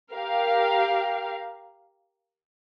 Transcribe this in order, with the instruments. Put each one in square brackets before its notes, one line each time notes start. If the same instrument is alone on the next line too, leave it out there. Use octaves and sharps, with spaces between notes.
[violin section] G4 A#4 F5